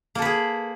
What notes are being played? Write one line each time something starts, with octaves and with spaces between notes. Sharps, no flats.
A#3 G#4 A4 B4